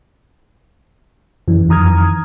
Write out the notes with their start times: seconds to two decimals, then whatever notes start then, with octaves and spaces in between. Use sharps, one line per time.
1.48 F#2 E3
1.69 F2 D#3 A#5 D#6 F6 G#6